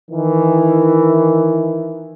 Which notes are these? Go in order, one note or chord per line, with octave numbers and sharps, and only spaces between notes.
D#3 E3